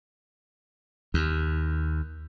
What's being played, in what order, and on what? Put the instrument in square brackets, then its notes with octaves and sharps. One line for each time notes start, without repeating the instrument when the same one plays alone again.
[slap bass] D#2